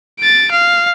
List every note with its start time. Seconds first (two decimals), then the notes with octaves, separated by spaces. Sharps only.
0.19 A6 D7
0.51 F5